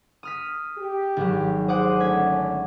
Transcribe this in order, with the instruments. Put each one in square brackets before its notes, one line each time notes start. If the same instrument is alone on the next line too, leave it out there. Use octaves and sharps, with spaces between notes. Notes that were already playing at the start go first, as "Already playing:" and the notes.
[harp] D#6 F6 B6
[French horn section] G4
[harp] G#1 F#3
[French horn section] G#4 C5 [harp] F#5 D6 D#6
[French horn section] D3 A3 C#4 [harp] G#6 B6